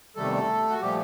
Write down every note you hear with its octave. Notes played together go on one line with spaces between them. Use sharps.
E2 C3 D#3 G3 A3 A4
F#4
A#2 F3 G3 A3 G4